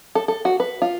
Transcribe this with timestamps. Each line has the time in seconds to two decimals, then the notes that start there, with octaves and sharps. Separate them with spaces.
0.15 A4
0.28 A4
0.45 F#4
0.60 B4
0.82 F4